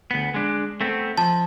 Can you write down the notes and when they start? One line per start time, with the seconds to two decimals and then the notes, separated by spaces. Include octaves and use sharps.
0.11 D2 B3
0.34 G#3 D4
0.81 A3 B3 C4
1.18 F3 A5